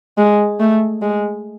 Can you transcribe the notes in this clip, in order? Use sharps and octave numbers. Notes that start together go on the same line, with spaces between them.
G#3
A3
G#3